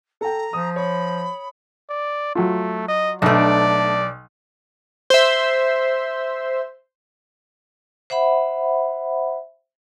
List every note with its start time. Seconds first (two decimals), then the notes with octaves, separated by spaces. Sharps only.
0.21 A4 G5 A#5
0.53 F3 D#6
0.76 C#5 B5
1.89 D5
2.35 F#3 A3 F4
2.88 D#5
3.22 B1 A3 D4 D5
5.10 C5 E5
8.10 C5 E5 F#5 B5